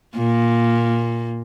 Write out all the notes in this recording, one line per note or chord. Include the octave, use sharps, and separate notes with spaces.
A#2 A#3